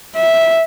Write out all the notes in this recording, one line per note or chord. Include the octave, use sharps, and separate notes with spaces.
E5